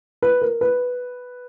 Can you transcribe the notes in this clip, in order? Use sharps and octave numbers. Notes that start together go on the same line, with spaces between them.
B4
A#4
B4